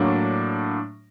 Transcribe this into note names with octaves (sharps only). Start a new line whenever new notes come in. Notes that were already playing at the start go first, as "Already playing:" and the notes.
Already playing: A2 F#3 A#3 D4